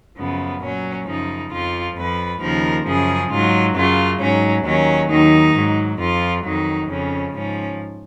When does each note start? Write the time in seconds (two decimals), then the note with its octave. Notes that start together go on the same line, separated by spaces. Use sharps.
0.19 F#2 C#3 F3 B3
0.63 A#2 F#3 C#4
1.07 F#2 C#3 F3 D#4
1.53 F2 F3 F4
1.97 F2 F3 B4
2.42 D#2 C#3 F3 A#4
2.87 F#2 C#3 F3 G#4
3.31 G#2 F#3 F4
3.76 F#2 C#3 F#3 F4
4.21 G#2 F#3 C#4
4.66 D#2 D#3 F#3 C#4
5.10 D#2 D#3 F#3 D#4
5.55 G#2 F#3
6.00 F2 F3 F4
6.45 F2 D#3 F#3 D#4
6.89 F2 C#3 F3 C#4
7.34 G#2 F3 C#4